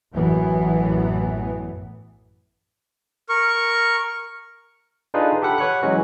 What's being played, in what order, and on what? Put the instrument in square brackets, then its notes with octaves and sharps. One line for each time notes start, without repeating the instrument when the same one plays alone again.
[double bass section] A1 F#2 E3 B3
[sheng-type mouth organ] A#4 C#6
[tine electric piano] D4 D#4 F4 G#4 A4 B4
G4 A4 F#5 B5
B4 C#5 F#5 F#6
E3 F#3 G#3 C#4 F#4